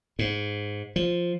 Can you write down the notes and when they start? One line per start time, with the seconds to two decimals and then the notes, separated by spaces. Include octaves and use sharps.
0.19 G#2
0.96 F3